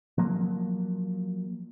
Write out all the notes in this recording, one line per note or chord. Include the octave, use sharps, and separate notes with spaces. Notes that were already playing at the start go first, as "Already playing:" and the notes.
F3 F#3 A#3